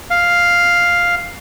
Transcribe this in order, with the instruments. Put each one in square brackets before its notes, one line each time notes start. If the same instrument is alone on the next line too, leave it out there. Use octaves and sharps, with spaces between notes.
[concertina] F5